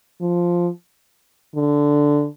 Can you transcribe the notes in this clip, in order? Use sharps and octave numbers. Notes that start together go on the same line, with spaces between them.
F3
D3